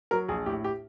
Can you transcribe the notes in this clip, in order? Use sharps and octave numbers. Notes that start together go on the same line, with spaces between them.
F#3 A#4
A#1 G#4
A2 G4
G4